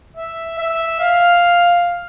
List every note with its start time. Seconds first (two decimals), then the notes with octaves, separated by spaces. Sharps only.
0.16 E5
0.58 E5
1.00 F5